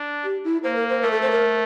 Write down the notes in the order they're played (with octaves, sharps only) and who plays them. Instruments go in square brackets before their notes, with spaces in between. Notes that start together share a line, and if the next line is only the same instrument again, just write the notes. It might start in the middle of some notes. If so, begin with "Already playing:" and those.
Already playing: [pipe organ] D4
[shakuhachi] G4
E4
[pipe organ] A#3 [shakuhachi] C5
[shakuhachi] A#4
C5
[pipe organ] A3 [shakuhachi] A#4
[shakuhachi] A4
C5
A#4